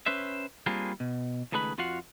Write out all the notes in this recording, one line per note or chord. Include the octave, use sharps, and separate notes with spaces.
C#4 B4 C5 E5
G3 A#3 C4 D4 F4 G#4
B2
C#2 D#3 A3 G#4 B4 B5
F2 F4 F#4 F5 F#5